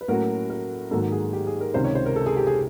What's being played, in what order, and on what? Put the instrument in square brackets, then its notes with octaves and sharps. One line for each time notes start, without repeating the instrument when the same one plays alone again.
[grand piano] B4
[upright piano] A2 F#3 A#3 C#4 F#4 [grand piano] A#4
[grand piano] A#4
[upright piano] G#2 D#3 F#3 A#3 [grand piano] A4
[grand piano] G#4
G4
G#4
A#4
[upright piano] C#2 C3 D#3 [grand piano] C5
[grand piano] C#5
C5
A#4
A4
G#4
G4
G#4